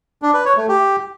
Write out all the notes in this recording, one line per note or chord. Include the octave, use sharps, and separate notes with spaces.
D4
B4
C#5
A3
G4